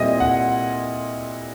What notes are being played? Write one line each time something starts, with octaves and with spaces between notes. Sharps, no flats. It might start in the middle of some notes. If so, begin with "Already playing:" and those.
Already playing: A#2 G3 C4 E4 D#5
F#5